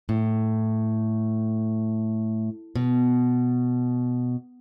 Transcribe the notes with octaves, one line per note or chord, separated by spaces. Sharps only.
A2
B2